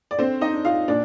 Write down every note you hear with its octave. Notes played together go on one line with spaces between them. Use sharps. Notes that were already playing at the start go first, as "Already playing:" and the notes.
D5
D3 C4 C5
D#4 D#5
D4
F4 F5
A#2 D4 D5